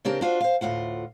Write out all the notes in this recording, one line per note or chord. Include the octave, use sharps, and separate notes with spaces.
C#3 C4 D4 G4 A#4
D4 F4 F#4 C5
C5 F5
D2 A2 F4 F#5